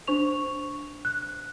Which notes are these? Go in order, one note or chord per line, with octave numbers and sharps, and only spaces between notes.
D4 C5 C#6 F7
F#6